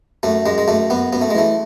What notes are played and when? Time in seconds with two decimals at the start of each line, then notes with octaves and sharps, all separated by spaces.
0.23 F#2 A3
0.46 F#2 G#3
0.58 G#3
0.68 F#2 A3
0.90 F#2 B3
1.13 F#2 B3
1.22 A3
1.31 G#3
1.35 E3 A3